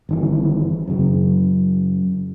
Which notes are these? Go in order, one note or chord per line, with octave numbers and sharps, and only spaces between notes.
G1 D#3 E3
F#2 C#3